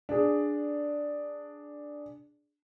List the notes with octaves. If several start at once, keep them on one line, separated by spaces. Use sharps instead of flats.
D4 G#4